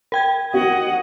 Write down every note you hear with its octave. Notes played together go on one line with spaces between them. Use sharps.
A#4 G5 G#6
F#4 D#5 F#5